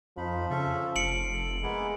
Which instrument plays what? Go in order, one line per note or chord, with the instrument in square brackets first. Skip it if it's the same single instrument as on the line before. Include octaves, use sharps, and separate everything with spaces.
[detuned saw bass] F2 [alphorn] F3 [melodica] D#4 B5
[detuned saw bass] C#3 [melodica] C#4 A4 E5
[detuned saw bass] F1 [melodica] F5 [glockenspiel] C#7 D7 F#7
[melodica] A4
[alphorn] G#3 [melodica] A#3 B3 E4